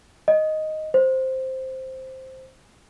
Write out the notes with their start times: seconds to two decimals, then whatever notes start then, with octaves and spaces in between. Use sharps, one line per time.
0.28 D#5
0.94 C5